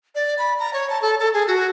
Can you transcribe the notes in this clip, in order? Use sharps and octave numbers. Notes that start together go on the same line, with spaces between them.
D5
B5
A#5
C#5
A5
A4
A4
G#4
F#4